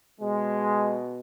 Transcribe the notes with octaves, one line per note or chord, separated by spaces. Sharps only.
B2 G#3